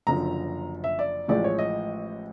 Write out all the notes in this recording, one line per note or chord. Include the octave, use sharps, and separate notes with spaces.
F#1 F#2 D3 F3 A#5
E5
D5
A1 A2 F3 G#3 D5
C#5
D#5